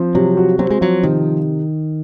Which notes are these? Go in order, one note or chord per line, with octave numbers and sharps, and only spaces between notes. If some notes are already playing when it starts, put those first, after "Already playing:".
Already playing: F3 C4
C3 F#3
F#4
F#3 C4
G#3
F3 F#3
C3 D#3